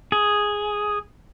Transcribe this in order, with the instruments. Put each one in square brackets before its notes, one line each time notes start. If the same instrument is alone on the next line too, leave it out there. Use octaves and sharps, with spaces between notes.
[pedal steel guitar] G#4